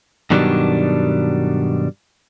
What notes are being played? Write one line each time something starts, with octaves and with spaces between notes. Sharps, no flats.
G2 B2 D#3 F#3 G3 D4